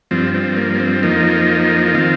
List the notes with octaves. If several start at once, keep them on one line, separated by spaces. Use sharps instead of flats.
G2 F3 C4
C4
A#3
C4
F2 F3 A#3 D#4
D#4
D#3 C4 F4